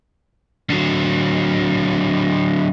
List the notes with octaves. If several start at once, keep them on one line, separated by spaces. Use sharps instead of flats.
D3 F#3